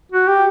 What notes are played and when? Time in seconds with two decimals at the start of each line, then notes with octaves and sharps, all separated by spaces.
0.12 F#4
0.28 G4